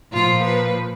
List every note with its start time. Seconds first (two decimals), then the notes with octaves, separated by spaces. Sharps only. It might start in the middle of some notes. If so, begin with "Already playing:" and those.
0.12 A#2 F3 F4
0.42 B4